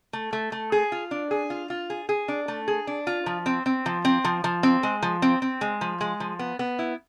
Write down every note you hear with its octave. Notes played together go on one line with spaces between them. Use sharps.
A3
A3
A3
G#4
F4
D4
G#4
F4
F4
G#4
G#4
D4
A3
G#4
D4
F4
F3
C4
C4
F3
C4
F3
F3
C4
G#3
F3
C4
C4
G#3
F3
G#3
F3
B3
B3
E4